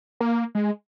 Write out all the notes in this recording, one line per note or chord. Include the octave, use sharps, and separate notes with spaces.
A#3
G#3